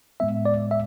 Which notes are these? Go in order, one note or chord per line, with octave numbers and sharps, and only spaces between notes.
A2 G#3 B3 E5
D5
E5